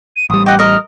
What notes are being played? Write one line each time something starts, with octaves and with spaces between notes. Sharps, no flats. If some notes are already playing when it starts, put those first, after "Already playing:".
D#7
A1 G3 D#6
G4 D#5 F#5
A#4 D#5 F6